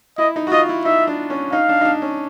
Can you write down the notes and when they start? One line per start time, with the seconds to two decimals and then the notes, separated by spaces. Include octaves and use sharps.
0.18 E4 D#5
0.36 D#4
0.47 F#4
0.52 F4 D#5
0.69 E4
0.85 D#4 E5
1.07 D4
1.30 C#4
1.52 D#4 F5
1.69 D4
1.81 D#4
1.85 D4
2.02 C#4